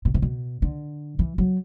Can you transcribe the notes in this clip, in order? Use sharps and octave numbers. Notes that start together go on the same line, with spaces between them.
B2
C3
B2
D3
E3
F#3